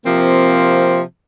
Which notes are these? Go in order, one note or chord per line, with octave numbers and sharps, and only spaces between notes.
C3 F3 A#3 C4